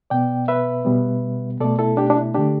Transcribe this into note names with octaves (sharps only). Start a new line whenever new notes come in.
B2 B3 D5 G5
B4 E5
B2 G3 B3
B2 A3 A4 D5
E4 A4
D4 G4
D4
E4
D3 A3 D4 G4